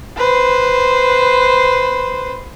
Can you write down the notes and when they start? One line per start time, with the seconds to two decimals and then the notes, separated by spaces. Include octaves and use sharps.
0.17 B4 C5